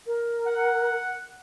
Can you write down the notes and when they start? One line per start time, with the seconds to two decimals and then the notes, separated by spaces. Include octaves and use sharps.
0.07 A#4
0.47 F#5